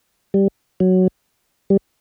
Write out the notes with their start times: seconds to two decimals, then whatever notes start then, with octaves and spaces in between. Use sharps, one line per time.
0.34 G3
0.80 F#3
1.70 G3